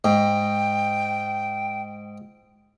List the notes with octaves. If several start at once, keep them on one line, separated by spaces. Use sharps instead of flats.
G#2 G5